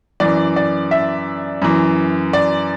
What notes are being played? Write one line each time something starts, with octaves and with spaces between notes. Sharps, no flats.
F#2 E3 D5
D5
E5
F#2 E3
D5